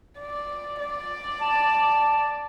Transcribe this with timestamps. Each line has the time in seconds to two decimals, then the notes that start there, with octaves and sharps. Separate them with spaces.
0.19 D5
0.80 D5
1.41 A5